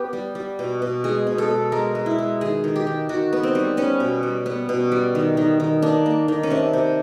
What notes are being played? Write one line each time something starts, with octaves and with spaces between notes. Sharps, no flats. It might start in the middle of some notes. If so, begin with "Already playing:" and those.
Already playing: B3 G4
G3
G3
B2
B2
G#3 G#4
B2
A4
B2
G#3 A#4
G#3
E4
G#3
D#3 G#4
D#3
G4
D#3
D#3 F#4
B3
C4
G3
B3 C#4
B2
G3
B3
B2
G3
D#3
D#3
D#3
A#3 D4
A#3
D#3
C#4
C3 D4
C3